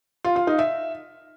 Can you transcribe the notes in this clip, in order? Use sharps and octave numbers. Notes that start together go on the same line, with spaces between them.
F4
F4
D#4
E5